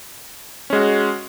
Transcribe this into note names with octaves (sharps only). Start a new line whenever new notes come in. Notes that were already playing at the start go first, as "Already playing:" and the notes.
G#3 C#4 F#4